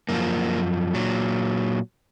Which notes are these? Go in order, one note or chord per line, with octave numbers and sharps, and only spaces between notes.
F#2 F3 A#3
A#2 F#3